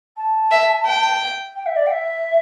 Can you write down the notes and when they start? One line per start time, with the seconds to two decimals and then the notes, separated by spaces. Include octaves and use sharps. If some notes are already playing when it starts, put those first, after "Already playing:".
0.17 A5
0.51 E5
0.86 G5
1.56 G5
1.66 E5
1.76 D5
1.86 G5
1.91 E5